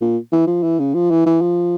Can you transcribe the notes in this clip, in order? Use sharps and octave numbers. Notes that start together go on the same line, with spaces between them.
A#2
E3
F3
E3
C#3
F3
E3
E3
F3